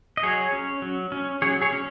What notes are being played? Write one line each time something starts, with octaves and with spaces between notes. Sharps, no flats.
D#5
F#3 G#4 C#5
C#4
F#3
C#4
F#3 G#4 C#5
G#4 C#5
C#4